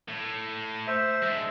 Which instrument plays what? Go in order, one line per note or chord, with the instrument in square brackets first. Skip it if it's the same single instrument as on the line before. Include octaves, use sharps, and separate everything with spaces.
[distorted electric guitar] A2
[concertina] C5 E5
[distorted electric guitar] G#3 D4